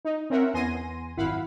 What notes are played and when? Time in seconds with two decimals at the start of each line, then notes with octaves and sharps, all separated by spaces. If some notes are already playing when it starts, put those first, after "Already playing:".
0.05 D#4
0.30 C4 C#4 A#4 E5 F#5
0.54 E2 B3 G#5 C6 A#6 D#7
1.17 G#1 F#2 E4 F5 F#5 B5